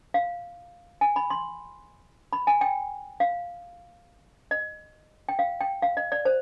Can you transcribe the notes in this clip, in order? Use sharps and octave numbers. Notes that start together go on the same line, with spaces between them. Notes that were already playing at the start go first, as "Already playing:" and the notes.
F5
G#5
B5
C6
B5
G#5
G5
F5
D#5
G5
F5
G5
F5
D#5
D5
C5